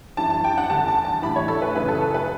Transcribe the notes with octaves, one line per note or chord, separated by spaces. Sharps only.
F#2 E3 A5
A5
G5
F#5
E2 D3 A5
A5
A5
A2 E3 B5
C#5
A4
B4
F#2 C#3 E3 B4
A4
A4
B4